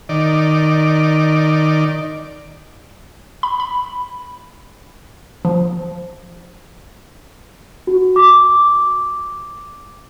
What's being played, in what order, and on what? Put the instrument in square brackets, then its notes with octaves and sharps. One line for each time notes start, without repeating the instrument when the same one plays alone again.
[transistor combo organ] D#3 D5
[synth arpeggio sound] B5
B5
F3
[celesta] F#4
D6